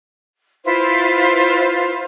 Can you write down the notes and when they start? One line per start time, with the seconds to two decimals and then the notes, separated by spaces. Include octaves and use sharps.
0.64 E4 F4 B4 C5